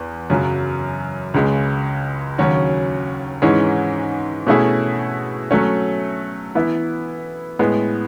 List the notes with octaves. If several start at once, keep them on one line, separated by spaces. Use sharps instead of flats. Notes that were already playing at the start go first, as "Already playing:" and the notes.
Already playing: E2 B3
F#2 C#3 F#3
C#2 C#3 G#3
D#2 C#3 F#3 C#4 F#4
G#2 E3 G#3 C#4
B2 A3 C#4 E4 G#4
F#3 A3 C#4
E3 B3 E4
A2 G#3 B3